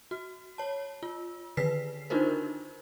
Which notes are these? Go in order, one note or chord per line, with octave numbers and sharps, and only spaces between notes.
F#4
C#5 A5
F4
D3 D#3 B4 B6 C7
D4 D#4 F4 F#4 A#4 C5